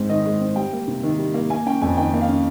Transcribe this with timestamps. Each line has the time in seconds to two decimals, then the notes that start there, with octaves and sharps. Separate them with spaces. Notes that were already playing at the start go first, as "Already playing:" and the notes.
Already playing: G#2 G#3 C4
0.09 D#3 D#5
0.26 G#3
0.40 C4
0.56 G3 G5
0.73 A#3
0.88 C3
1.03 D#3
1.18 G3
1.34 A#3
1.50 A#3 G#5
1.66 C#4 G5
1.82 F2 G#5
1.97 D#3 G5
2.13 A#3
2.21 F5
2.29 C#4